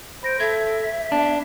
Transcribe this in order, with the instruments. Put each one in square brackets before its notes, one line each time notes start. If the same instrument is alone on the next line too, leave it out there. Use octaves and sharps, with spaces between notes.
[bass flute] C5 [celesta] B5 A#6 D7
[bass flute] A4 [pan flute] E5 [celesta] G#6
[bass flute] B3 [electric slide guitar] D4